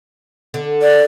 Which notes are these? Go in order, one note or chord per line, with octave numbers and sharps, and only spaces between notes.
D3
D5